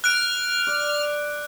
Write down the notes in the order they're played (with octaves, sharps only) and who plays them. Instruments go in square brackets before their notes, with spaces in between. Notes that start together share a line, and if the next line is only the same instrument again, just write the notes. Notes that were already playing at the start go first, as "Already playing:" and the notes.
[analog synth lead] F6 [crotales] F#6 D7
[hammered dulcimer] D5